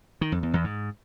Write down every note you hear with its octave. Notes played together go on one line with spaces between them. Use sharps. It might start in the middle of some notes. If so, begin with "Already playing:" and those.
D#3
F2
E2
E2
G#2